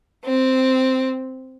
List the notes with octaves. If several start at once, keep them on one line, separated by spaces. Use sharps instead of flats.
C4